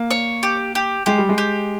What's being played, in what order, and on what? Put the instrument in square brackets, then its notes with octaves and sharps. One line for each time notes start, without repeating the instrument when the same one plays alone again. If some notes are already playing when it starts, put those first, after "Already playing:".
Already playing: [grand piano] A#3
[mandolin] C#5
G4
G4
[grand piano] G#3 [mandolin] G4
[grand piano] G3
G#3
[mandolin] G4